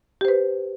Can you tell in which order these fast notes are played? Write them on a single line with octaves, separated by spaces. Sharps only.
G4 C5 B4